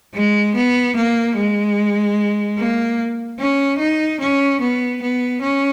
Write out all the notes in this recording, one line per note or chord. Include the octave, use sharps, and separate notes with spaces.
G#3
B3
A#3
G#3
A#3
C#4
D#4
C#4
B3
B3
C#4